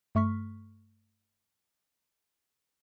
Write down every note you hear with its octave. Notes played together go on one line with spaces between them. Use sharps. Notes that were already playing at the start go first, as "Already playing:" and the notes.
G2 A3 C#6 F6 B6